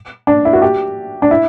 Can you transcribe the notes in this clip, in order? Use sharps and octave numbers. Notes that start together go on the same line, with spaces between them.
D4
E4
F#4
G4
D4
E4